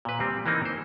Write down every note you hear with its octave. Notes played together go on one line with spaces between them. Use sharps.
A#2 B4
G3 C4
E3 A#3 C4 D#4
C5